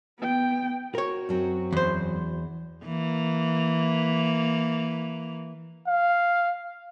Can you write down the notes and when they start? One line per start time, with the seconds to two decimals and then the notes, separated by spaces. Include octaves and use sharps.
0.18 B3 G5
0.95 F#4 A#4 C#5
1.29 F#2 F#3 C4
1.72 E2 C5
2.85 E3 A#3
5.88 F5